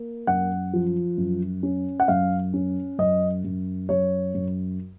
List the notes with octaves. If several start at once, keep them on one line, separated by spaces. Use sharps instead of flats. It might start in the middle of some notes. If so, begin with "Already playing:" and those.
Already playing: A#3
F#2 F#5
F3
F#2
C#4
F#5
F#2 F5
C#4
F#2 D#5
F#2
F#2 C#5
F#2